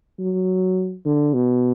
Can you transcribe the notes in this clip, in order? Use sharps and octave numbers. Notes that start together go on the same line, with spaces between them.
F#3
D3
B2